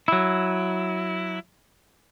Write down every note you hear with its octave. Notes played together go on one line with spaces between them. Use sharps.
F#3 E4